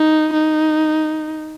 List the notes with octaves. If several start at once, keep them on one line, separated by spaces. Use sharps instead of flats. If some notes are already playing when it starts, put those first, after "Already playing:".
Already playing: D#4
D#4